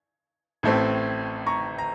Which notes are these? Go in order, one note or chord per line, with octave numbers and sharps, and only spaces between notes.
A1 A2 A3 C4
A#5 C#6
A#5